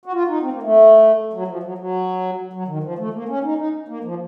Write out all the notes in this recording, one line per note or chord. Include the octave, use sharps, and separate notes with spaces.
F#4
F4
D#4
C4
A#3
A3
F#3
F3
F#3
F#3
F#3
D#3
F3
A3
A#3
C#4
D#4
D#4
A#3
F3